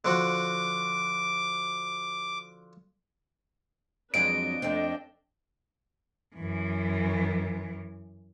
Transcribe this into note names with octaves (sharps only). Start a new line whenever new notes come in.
D3 F3 F#4 D6
F2 F#3 G#3 D4 B4 D#5 D7
F2 A3 C4 D4 D#5 G5
F#2 E3